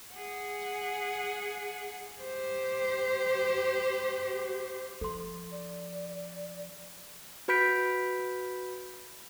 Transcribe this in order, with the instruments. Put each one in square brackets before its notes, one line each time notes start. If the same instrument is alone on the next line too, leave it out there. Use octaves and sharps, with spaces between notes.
[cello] G#4 F#5
G4 C5
[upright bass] F3 [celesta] A4 C6
[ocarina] D5
[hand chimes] F#4 B4 B5 G6 B6 D7